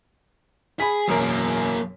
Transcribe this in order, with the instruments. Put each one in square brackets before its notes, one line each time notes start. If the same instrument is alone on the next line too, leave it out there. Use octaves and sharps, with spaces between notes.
[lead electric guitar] G#4 [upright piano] B5 B6
[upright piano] E1 F#2 A#4 [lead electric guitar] F#3 A#3